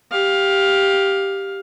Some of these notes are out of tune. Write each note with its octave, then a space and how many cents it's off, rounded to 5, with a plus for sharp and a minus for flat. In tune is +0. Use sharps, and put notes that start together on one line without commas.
G4 +0 F5 +15